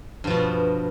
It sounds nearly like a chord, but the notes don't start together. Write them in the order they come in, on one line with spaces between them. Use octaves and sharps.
G2 F3 B2